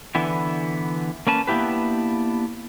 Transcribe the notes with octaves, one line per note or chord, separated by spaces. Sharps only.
D3 E3 B3 E4
A#3 C#4 B4 A5
A#3 B3 D4 E4 G4 B4